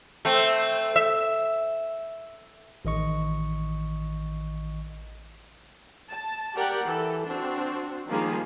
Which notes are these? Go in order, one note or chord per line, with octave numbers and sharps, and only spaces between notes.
A3 C4
E5
A1 D#3 D#5 C#6
A5
G4 A#4 D5 F#5 G5
E3 A4
C4 D4 F#4
D#3 F3 G3 A#3 G#4